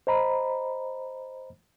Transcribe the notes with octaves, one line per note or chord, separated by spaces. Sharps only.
C5 D#5 A#5 B5